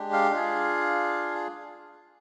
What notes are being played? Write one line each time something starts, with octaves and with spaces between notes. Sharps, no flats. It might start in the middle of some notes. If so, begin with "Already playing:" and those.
Already playing: G#3 D4 G4
F5
D4 F4 G#4